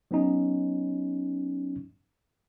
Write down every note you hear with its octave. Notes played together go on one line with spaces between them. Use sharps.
F#3 B3 C#4 D#4